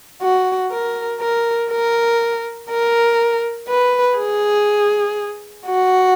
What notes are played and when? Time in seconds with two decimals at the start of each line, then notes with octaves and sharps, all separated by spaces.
0.22 F#4
0.72 A#4
1.21 A#4
1.71 A#4
2.70 A#4
3.69 B4
4.18 G#4
5.66 F#4